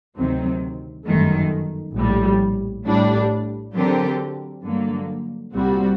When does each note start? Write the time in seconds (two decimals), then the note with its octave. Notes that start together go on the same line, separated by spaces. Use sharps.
0.17 D2 C3 D#3 F#3 C4
1.06 G1 F#2 D#3 A3
1.95 A#1 A2 G3
2.85 A2 G3 D4
3.75 D3 F#3 C4 G4 A#4
4.65 G2 D3 F#3 A#3
5.54 C2 A#2 G3 C4 F#4